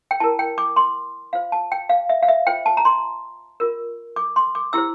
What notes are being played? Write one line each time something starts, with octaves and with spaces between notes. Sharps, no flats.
G5
E4 A#4 A5
G5
D6
C6
F4 C5 F5
A5
G5
F5
E5
F5
E5
F4 C5 G5
A5
A#5
C6
F4 A#4
D6
C6
D6
E4 G4 C5 E6